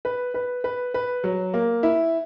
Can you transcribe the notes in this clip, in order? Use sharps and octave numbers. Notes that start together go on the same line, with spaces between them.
B4
B4
B4
B4
F#3
A#3
E4